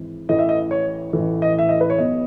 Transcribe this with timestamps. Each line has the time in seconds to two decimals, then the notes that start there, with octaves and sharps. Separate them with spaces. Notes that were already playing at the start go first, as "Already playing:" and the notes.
Already playing: G#1 G#2 E3
0.29 A1 A2 E3 D#5
0.39 E5
0.49 D#5
0.71 C#5
1.13 A1 A2 E3
1.42 D#5
1.59 E5
1.69 D#5
1.81 B4
1.90 C#5
1.98 B1 B2 D#5